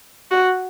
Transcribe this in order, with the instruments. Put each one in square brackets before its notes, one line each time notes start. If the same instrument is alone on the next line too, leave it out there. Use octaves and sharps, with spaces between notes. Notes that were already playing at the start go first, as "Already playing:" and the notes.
[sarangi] F#4